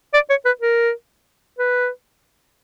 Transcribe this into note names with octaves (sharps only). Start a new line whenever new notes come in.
D5
C#5
B4
A#4
B4